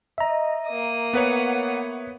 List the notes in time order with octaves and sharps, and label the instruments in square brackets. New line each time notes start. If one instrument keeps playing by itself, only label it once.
[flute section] D#5 [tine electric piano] E5 A#5
[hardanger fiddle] A#3 D#6
[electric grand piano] B3 B4 C#5 [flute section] F#5